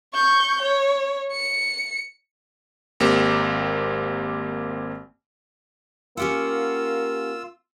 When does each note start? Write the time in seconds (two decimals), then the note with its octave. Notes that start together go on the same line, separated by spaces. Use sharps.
0.14 C#6 G6
0.62 C#5
1.32 C#7
3.00 G#1 A#3 C4 G4
6.17 A#3 C#4 F4 G4 F#5 E6